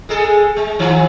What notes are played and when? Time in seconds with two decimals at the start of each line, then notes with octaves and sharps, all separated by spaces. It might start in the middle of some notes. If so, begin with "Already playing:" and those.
0.09 G#3 G#4 A4
0.56 G#3
0.79 D#3 F3